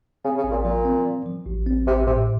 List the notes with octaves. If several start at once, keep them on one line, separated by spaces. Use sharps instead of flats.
C#3 C4
C#3
A1
A#2
A#2 F3
C4
F3
F3
A1
C4
A1 C3
A2 C3